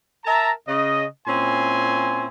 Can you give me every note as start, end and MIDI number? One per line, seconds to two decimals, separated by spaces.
0.25 0.51 70
0.25 0.51 76
0.25 0.51 81
0.25 0.51 82
0.68 1.05 49
0.68 1.05 75
1.27 2.28 46
1.27 2.28 60
1.27 2.28 61
1.27 2.28 64
1.27 2.28 80
1.27 2.28 84